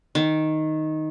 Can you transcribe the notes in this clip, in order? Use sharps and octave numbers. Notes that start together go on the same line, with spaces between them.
D#3